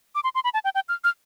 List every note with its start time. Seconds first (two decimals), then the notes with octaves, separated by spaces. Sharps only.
0.15 D6
0.24 C6
0.35 C6
0.44 B5
0.54 A5
0.64 G5
0.75 G5
0.89 F6
1.04 F6